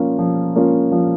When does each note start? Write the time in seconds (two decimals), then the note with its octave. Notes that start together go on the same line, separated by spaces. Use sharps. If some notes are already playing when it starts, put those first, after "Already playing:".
Already playing: F3 A#3 C#4 F4
0.19 F3
0.56 A#3 C#4 F4
0.92 F3